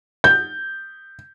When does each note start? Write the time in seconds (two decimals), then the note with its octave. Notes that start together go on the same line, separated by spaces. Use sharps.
0.24 G6